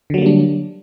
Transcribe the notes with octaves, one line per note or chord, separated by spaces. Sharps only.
D3 F#3 G3 A#3 D4